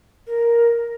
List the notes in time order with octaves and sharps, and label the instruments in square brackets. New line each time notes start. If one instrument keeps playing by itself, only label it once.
[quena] A#4